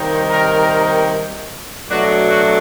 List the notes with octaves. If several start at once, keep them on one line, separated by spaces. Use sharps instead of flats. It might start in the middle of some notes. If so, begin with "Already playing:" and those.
Already playing: C3 D#3 G3 A#3 D#4
A#4
B2 F#3 A3 D4 F#4
F#4